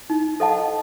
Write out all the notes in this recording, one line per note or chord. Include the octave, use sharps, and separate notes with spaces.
D#4
A4 D#5 F#5 A5